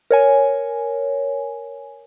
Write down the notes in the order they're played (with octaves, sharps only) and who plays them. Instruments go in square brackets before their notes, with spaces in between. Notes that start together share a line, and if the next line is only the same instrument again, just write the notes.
[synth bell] A#4 C#5 G#5